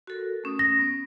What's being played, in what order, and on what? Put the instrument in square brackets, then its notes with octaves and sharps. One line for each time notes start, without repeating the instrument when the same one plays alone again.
[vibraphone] F#4 A4 A#4
A3 C#4 D#6
[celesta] A#6
[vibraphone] B3 C#4